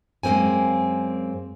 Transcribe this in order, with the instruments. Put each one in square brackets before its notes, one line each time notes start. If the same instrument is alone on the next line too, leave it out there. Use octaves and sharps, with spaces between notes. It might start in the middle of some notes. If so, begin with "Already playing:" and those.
[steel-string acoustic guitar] F#2 G#3 A#3 C4 G#5